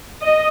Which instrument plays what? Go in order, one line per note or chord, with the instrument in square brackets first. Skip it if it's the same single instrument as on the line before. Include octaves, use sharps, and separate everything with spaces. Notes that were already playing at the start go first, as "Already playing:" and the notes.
[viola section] D#5